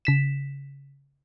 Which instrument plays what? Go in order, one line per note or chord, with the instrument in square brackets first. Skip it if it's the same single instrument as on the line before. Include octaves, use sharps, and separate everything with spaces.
[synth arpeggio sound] C#3 B6 E7